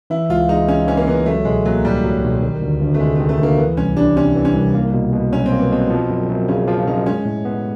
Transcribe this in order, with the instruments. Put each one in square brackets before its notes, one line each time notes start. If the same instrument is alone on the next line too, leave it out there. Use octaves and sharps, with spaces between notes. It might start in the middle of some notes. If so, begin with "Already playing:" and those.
[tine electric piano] E3 [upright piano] E4
[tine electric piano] C#2 [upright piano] F4
[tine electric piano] G#3 [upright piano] D#4
[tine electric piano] C#3 [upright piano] C#4
[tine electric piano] E3 [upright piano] C#4
[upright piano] A#3
[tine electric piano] C#2 [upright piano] B3
[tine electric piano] F#3 [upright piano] A3
[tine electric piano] B1 [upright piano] G#3
[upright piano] F#3 [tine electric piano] A#3
[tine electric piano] A2 [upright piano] G3
[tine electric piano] F#3
B1
D#3
D2
D2
[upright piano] A3
[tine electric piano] C3 [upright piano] G#3
[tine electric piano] D#3 [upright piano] A3
[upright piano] A3
[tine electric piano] D2 [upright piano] A#3
[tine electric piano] E3 [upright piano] B3
[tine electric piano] C2 [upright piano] C#4
[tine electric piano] G3 [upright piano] D4
[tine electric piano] C3 [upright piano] C#4
[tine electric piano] E3
[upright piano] C#4
[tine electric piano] C2
A#3
B2
B2
[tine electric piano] F#3 [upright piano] C#4
[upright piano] C4
[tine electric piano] A#3
[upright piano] B3
[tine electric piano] B2 [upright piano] C4
[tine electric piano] F3
F#2
F#2
[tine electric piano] C#3 [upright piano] C#4
[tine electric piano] F3 [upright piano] F4
[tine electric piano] F#2 [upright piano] D#4
[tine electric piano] G#3 [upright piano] C#4
[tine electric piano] A2
B3